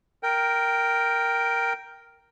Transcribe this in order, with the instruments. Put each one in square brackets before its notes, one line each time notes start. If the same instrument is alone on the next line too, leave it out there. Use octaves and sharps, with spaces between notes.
[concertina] A#4 G5